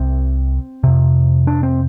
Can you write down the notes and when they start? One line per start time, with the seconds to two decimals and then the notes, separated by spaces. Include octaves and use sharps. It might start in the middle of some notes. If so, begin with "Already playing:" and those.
Already playing: C2 C3 C4
0.84 F2 C3
1.47 D4
1.63 C4